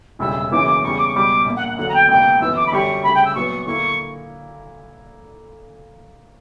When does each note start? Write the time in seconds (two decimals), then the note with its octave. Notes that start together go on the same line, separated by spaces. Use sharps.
0.19 E1 D2 C#3 G3 E6
0.51 F#2 C#3 E3 A#3 D6
0.67 D6
0.82 E2 C#3 G3 C#6
0.98 D6
1.07 C#6
1.14 C#2 B2 G3 D6
1.46 A#1 A#2 A#3
1.56 F#5
1.66 F#5
1.77 E2 D3 F#3 A#3 F#5
1.88 A#5
1.94 G5
2.08 C#2 B2 A#3 G5
2.40 G1 F#2 E3 B3 E6
2.56 D6
2.66 B5
2.72 F#2 D3 G3 C#4 G4 C#6
3.03 D2 C#3 G3 B5
3.14 G5
3.24 E6
3.35 A#2 F#3 B3 C#6
3.66 D3 A#3 E4 C#6